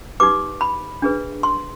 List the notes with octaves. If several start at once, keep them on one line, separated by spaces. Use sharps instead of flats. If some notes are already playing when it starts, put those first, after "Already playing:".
D#4 G4 B4 D6
B5
D4 G#4 B4
C6